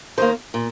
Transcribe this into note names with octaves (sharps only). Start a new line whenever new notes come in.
D#3 A#3 C5
A#2